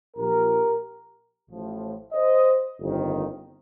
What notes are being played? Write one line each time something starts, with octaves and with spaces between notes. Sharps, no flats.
A#1 A#2 F3 G4 A#4
A1 A2 F3
C5 D#5
G1 F2 D#3